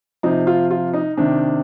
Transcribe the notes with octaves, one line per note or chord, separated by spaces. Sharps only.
C3 F3 D#4
F4
F4
D#4
C3 D#3 D4